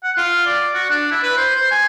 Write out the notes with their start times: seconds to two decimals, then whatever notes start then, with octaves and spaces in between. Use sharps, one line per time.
0.03 F#5
0.17 F4
0.46 D5
0.74 F#4
0.90 D4
1.11 E4
1.23 B4
1.37 C5
1.56 C5
1.71 G#5